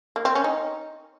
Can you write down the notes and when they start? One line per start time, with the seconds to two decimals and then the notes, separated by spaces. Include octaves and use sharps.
0.16 A#3
0.25 C4
0.35 C#4
0.44 D#4